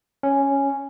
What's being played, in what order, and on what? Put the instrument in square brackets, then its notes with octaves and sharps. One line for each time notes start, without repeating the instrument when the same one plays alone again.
[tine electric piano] C#4